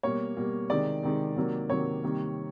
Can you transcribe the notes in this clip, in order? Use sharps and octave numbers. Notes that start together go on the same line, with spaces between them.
B2 G3 A#3 C#5
B2 G3 A#3
C3 D#3 G#3 D5
C3 D#3 G#3
C3 D#3 F#3 A#3
C3 D#3 F#3 A#3 C#5
C3 D#3 G3 A#3